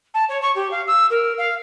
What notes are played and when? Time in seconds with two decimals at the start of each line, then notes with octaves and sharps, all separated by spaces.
0.14 A5
0.29 C#5
0.42 C#6
0.55 G4
0.71 F5
0.87 E6
1.10 A#4
1.38 F5